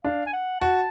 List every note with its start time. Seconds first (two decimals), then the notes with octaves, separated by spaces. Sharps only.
0.04 D4 F5
0.26 G#5
0.33 F#5
0.61 F#4 A5